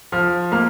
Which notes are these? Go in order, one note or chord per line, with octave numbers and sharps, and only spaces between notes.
F3 F6
A#3 F6